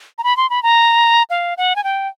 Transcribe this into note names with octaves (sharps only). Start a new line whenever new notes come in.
A#5
B5
C6
B5
A#5
F5
F#5
G#5
G5